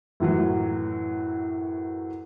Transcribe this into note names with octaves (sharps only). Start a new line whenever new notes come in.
F#2 A2 E3 F#3